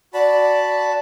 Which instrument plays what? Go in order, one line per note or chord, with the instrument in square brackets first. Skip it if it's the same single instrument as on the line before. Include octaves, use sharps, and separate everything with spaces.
[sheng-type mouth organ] F#4 A5 B5 [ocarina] D5